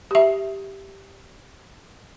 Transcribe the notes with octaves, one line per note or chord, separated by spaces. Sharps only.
G4 E5